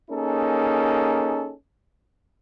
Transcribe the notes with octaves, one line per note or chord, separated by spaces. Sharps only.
A#3 C#4 D#4 G#4 A4